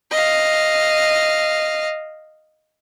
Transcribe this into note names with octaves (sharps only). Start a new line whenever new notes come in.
D#5 F5